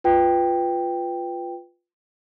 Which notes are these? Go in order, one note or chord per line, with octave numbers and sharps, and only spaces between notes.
F4 B4 G5